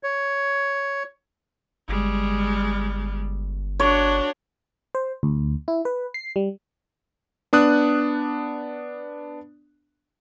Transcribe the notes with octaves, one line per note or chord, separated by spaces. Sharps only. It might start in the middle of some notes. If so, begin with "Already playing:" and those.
C#5
G1 G3 G#3
D4 F#4 C#5
C5
D2
E4
B4
C7
G3
B3 D4 D#6 F#6